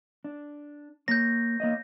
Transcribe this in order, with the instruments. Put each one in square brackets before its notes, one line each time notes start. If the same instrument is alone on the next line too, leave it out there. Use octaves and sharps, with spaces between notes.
[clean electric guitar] D4
[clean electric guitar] A#3 C#5 [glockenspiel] G6 A#6
[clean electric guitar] A#3 C#5 D#5